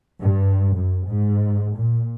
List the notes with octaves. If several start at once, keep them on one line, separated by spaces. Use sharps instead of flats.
G2
F#2
G#2
A#2